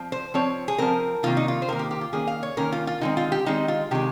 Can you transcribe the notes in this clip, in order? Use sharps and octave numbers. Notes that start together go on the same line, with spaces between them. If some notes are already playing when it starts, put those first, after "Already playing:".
Already playing: F3 C4
C5
F3 C4 C#5
G#4
F3 C4 A#4
C3 D#3 A#3 F4
D#4
F4
C5
C3 D#3 A#3 A#4
G4
G4
F4
D#3 A#3 C#4 G#4
F5
C#5
D#3 A#3 C#4 A#4
F4
F4
D#3 G#3 C4 D#4
F4
G4
D#3 G#3 C4 D#4
F4
C3 D#3 G#3 G4